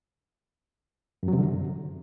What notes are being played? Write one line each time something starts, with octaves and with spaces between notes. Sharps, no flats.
F#2
F#3
C3
D3
F#2